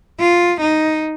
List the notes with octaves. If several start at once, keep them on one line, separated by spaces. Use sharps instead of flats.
F4
D#4